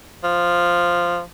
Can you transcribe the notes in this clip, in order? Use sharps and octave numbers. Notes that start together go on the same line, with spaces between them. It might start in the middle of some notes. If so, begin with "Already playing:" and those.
F3